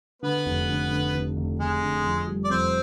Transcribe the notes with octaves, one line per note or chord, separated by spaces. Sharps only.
D3 B3 B4
F1
D3
D3
F1
F1
F1 G#3 G#4
D3
F2
G3
D5
F2 C4 C5